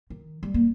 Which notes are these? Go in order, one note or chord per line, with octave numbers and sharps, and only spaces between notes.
D#3
G3
A#3